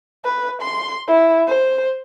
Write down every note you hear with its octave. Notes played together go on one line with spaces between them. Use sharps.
B4
C6
E4
C5